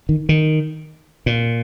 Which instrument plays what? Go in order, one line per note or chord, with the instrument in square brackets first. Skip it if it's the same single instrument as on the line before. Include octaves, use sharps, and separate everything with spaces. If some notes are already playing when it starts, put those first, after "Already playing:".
[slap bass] D#3
D#3
A#2